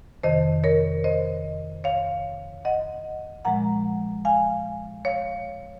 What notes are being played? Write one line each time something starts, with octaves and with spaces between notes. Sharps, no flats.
F2 C3 D#3 C5 D#5
A#4 C#5
C5 D#5
C#5 F5
D#5 F#5
A#2 F3 G#3 F#5 A#5
F5 G#5
C#5 F5